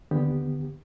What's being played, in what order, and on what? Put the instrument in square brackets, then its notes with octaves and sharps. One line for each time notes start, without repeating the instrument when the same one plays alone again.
[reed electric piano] D#2 D3 B3 G4